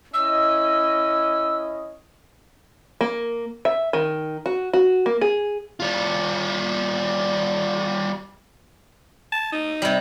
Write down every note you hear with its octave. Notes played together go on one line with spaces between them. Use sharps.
C#4 E4 D#5 E6
A#3
E5
D#3
F#4
F#4
A#3
G#4
G3 F4
A5
D#4
C3 G3